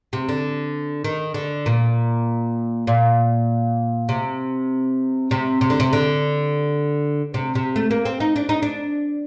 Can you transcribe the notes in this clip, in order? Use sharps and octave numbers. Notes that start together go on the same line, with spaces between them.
C3
D3
D#3
D3
A#2
A#2
C3
C3
C3
D3
C3
D3
C3
C3
A3
A#3
C4
D#4
D4
D#4
D4